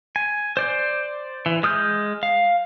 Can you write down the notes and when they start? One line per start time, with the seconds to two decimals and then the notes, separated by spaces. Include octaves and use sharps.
0.16 G#5
0.57 C5 D5 G6
1.46 E3
1.63 G#3 D#6 F6 G6
2.23 F5